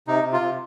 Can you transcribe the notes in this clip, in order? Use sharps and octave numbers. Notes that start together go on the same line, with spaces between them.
C3 D#4
C3
F4
C3